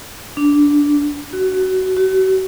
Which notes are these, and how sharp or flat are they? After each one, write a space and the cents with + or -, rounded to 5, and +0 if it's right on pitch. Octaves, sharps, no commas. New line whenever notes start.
D4 -10
F#4 +20
F#4 +40